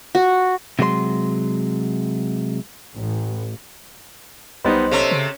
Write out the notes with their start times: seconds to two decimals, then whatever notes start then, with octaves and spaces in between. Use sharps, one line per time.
0.15 F#4
0.79 C3 F#3 G#3 C5 C6
2.95 A1
4.65 B1 G3 B3 D#4 C5 D#5 C6
4.91 C3 A3 C#4
5.11 C#3